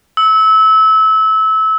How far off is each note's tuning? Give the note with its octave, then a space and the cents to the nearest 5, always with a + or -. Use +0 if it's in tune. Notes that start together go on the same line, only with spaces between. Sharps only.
E6 -25